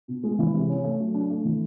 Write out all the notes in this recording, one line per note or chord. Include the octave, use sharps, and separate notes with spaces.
B2
G#3
E3
C3
C#4
A3
F#3
D4
A3
E3